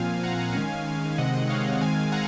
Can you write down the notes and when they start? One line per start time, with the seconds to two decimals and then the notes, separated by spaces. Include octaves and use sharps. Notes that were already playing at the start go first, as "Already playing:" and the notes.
Already playing: A#2 F3 C4 F5 G#5
0.23 F#5 A#5
0.39 F#5 A#5
0.55 D#3 G#3 C#4 F5 G#5
1.18 C3 D#3 G#3 C4 D#5 F#5
1.49 C#5 F5
1.81 D#3 G#3 C4 F5 G#5
2.12 F#5 A#5